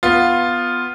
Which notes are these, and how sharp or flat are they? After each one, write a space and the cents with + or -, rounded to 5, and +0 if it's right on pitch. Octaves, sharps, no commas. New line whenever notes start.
B3 +0 F4 +0